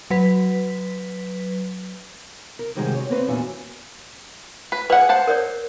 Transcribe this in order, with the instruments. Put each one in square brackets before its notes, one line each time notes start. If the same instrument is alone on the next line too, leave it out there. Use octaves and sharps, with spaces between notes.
[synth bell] F#3 B4 B6
[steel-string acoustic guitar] A#4
A2 C3 D#3 G3 G#3 F#4
C#5
A#3 C4 B4 C#5
E2 A#2 D4 F#4 E5 G#5
[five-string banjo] B4
[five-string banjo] G#4 F#5 [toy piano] B4 D5
[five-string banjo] C5 F#5 A5
[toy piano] A#4 C#5 D5